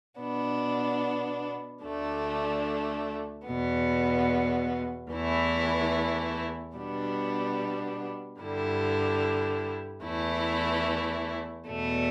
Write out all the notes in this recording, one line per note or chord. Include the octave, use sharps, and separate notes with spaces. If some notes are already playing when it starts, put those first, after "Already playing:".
B2 B3 D4
D2 D3 A3 D4
E2 B2 B3
E2 E3 A3 E4
B2 G3 B3 D4
G2 D3 G3 E4
E2 E3 A3 E4
E2 B2 A3